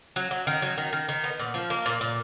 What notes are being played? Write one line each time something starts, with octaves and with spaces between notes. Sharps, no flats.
F#3
F#3
D#3
F#3
D#3
D#3
D#3
B3
A#2
F3
A#3
A#2
A#2